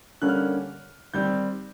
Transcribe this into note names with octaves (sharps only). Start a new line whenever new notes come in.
D3 G3 A#3 C#4 F#6
F6
F#6
D#3 G3 C4 G6